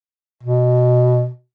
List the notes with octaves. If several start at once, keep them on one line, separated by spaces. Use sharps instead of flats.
B2